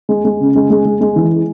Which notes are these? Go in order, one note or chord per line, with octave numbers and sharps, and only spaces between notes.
G#3
G#3
C#3
G#3
G#3
G#3
G#3
E3